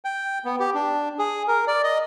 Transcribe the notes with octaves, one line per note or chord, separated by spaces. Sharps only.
G5
B3
G4
D4
G#4
A#4
D5
D#5